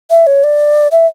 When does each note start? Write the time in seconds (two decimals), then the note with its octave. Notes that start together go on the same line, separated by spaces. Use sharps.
0.10 E5
0.27 C#5
0.44 D5
0.92 E5